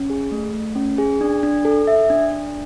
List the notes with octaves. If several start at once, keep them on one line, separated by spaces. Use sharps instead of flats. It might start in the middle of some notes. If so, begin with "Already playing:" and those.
Already playing: C#4
G#4
A3
A3
C#4
G#4
D4
D4
A4
E5
D4
D4